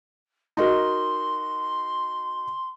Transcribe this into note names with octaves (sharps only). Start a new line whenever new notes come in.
D#4 F#4 A#4 C6